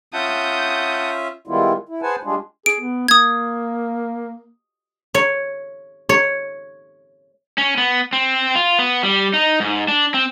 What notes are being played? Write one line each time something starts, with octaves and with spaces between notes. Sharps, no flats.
C#4 F4 E5 F#5 A5 D#6 G6
D#3 G3 G#3 B3 E4 F4
E4
G#4 B4 C5 F#5 G#5 A5
G3 G#3 D4 F4 G#4
G#4 D7
B3
A#3 D#6 G#6
C#5
C#5
C#4
B3
C4
F4
B3
G3
D#4
G#2
D4
C4